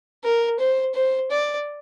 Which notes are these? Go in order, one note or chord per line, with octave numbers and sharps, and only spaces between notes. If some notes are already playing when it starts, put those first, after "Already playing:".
A#4
C5
C5
D5